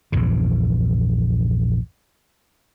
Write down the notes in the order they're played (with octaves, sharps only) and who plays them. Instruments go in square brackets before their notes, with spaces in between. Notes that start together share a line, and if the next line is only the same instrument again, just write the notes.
[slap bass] A#1 E2 G2 C#3